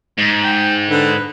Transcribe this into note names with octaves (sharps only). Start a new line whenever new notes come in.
G#2
G5
D3 B4